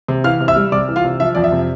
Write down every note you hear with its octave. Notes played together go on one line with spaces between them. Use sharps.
C3
E3 F5 F6
C3
E5 E6
G3
C3 D5 D6
E3
F4 F5
C3
F3 E5
F2 D5
E5
C3